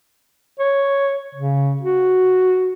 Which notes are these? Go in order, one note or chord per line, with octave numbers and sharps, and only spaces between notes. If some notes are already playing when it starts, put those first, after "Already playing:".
C#5
C#3
F#4